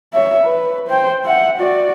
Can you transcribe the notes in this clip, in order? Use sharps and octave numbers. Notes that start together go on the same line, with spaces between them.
C#5 E5
B4
C5 G5
E5 F#5
F#4 D5